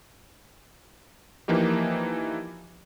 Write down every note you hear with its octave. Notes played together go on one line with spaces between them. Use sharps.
E3 F3 A#3 D#4 G4